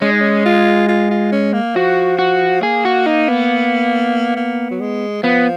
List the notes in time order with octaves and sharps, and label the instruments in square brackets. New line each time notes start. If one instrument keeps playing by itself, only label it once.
[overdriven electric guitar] G#3 [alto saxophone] C#4
[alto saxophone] D#4
C#4
F4
F4
F4
C#4
A#3
[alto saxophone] F3 [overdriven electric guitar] F#4
[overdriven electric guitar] F#4
[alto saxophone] A#3 [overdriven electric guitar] G#4
[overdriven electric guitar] F#4
D#4
B3
[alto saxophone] A#3
F#3
G#3
[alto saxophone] F3 [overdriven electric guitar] B3